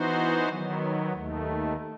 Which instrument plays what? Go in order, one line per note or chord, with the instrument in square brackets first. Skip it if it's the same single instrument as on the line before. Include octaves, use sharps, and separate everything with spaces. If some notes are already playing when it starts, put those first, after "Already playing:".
Already playing: [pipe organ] E3 B3 D#4 F#4 C5
D#3 F#3 B3
D#2 D#3 A3